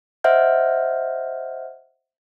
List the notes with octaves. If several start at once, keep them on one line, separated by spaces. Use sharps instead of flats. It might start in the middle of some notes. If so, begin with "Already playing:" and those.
C5 D#5 E5 F#5 F6 G6